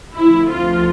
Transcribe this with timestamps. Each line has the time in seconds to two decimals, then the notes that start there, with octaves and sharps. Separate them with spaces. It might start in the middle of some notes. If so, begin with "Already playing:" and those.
0.15 D2 C3 F3 E4
0.50 F4